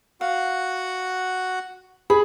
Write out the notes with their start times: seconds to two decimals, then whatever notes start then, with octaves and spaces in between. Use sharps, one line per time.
0.21 F#4 F5 F#5
2.10 G#4 B5